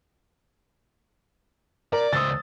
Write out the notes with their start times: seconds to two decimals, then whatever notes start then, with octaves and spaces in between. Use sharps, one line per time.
1.93 A#4 D5
2.13 C#2 C5 D#6 E6 A6